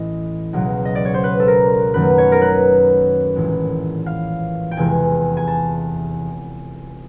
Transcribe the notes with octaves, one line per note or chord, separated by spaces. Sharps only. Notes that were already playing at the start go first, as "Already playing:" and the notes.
Already playing: A1 A2 E3 D#5
C#2 B2 F#3
D#5
D5
C#5
C5
B4
A4
A#4
F#2 D#3 F#3 A3 B4
C#5
A#4
B4
A#1 A2 E3 G#3
F5
G5
F1 E2 C3 E3 G#3 G#5
G#5
A5